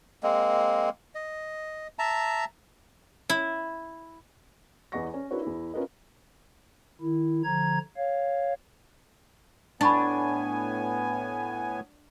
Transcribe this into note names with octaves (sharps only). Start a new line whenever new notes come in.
G#3 A#3 C4
D#5
E5 A5 A#5
E4
E2 E3 D#5 F#5 C#6 A#6
C#4
D4 E4 F#4 A#4 B4 C#5
E2 E4
C#4 F4 A#4 B4 D#5
D#3 E4
D3 F3 A#5 G#6
C#5 F5
A2 B3 D4 G#5 B5 C#6 A6